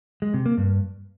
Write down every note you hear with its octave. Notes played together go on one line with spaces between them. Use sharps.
G#3
C3
A#3
G2